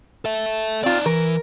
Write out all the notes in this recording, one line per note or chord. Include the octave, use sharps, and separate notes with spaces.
A4 E5
C4 D#4 F4 D5
E3 A#4